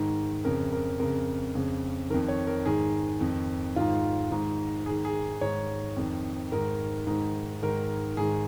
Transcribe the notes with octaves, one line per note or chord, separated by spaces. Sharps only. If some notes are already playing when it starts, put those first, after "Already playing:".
Already playing: G#2 D#3
F2 C#3 A#4
A#4
F2 C#3 A#4
F2 C#3
F2 D#3 A#4
C#5
A#4
G#2 D#3 G#4
F2 D#3
G#2 D#3 F4
G#2 D#3
G#2 D#3 G#4
G#4
G#2 D#3 C#5
F2 D#3
G#2 D#3 A#4
G#2 D#3
G#2 D#3 A#4
G#2 D#3 G#4